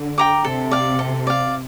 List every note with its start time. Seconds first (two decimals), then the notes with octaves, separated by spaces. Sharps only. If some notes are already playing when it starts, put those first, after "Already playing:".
Already playing: D3
0.18 G5 A#5 D6
0.45 C3 A4
0.71 D5 F5
0.99 A4
1.27 D5 F5